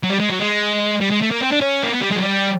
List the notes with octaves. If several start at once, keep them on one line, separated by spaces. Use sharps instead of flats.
F#3
G3
G#3
F#3
G#3
G3
G#3
A3
A#3
C4
D4
C#4
A#3
B3
G3
G#3
F#3
G3